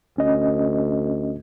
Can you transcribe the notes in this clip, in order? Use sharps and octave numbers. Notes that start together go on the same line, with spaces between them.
D2 C#4 D#5